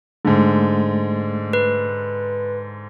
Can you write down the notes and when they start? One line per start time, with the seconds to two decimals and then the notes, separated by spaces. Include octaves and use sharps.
0.25 G#2 D3 G#3 A3
1.53 B4